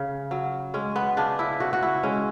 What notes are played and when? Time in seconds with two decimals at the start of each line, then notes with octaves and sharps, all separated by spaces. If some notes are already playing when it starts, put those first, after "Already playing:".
Already playing: C#3
0.31 F#3
0.74 G#3 C#4
0.96 B3
1.17 C#3 D4
1.39 E4
1.60 C#3 F#4
1.73 F#4
1.82 E4
2.03 G#3 C#4